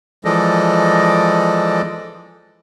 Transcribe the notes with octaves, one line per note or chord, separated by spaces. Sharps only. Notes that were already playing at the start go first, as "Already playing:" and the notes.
E3 F3 G#3 A4 D5 D#5